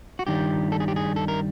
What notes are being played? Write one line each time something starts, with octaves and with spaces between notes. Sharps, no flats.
F#4
G2 D#3 G3 G4
A4
G#4
G4
G#4
A4
A#4